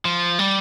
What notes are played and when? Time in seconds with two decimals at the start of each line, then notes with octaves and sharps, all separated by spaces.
0.05 F3
0.39 G3